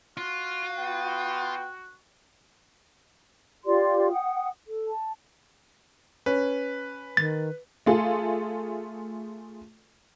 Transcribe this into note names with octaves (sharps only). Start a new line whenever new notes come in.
F4 F#4
B3 G5
F4 G4 D5 C6
F#5 G5 D#6
A4
A5
C#4 B4
D#3 A6
A3 F4 G#4 A4